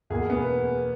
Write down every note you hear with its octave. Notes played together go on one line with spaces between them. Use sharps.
E2 B2 A#3 G#4
B3